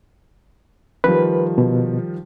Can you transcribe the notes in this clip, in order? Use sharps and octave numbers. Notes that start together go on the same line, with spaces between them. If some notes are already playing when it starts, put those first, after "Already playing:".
D#3 F3 G3 B4
B2